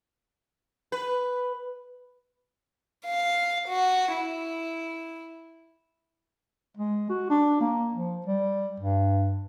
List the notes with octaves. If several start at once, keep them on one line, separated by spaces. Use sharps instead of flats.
B4
F5
F#4
E4
G#3
F#4
D4
A#3
F3
G3
G2